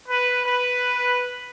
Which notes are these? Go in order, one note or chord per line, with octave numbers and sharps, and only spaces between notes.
B4
B4